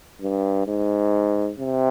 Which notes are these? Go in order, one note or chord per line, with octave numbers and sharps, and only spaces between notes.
G2
G#2
C3